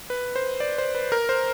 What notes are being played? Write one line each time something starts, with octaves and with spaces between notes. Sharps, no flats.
B4
C5
D5
C5
B4
A#4
C5